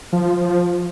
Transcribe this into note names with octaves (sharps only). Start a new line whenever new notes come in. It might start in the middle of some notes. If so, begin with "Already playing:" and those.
F3
F3